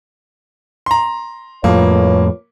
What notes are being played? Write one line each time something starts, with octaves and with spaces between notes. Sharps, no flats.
A#5 C6
F2 A2 A#3 F4 B4 C#5